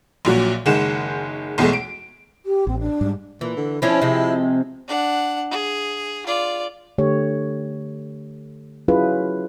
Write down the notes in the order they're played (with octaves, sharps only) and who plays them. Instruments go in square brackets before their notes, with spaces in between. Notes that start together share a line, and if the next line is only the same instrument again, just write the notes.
[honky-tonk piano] A#1 A#2 F#3 F#4
F#1 D#3 G#3 F#5 E7
B1 E2 B2 G#3 A3
D7
[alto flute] G4
[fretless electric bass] A1 [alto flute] C4
[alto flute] D4
[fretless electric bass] G#2 G3
[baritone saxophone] A#2 [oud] E3
[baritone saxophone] D3
[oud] F3 C#4 D4 [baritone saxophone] E4
[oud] C3 F3 G#3
[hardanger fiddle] D4 F#5
G#4
F4 D5
[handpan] D3 A3 G4 C#5
F#3 C#4 E4 F4 G#4 B4